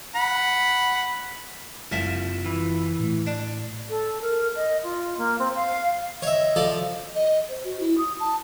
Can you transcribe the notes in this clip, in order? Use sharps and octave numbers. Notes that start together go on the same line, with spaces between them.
F#5 B5
F#1 C2 F3 E5
E3
A2 A3
D4
A4
A#4
D#5
F4
A#3
C4
F5
C#5 D#5 E5
F3 A4 D5
D#5
C5
F#4
E4
D#6
A5